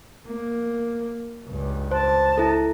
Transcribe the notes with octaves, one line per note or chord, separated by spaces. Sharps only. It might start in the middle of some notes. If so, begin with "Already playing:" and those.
A#3
C#2 G2
C5 A5
E4 A4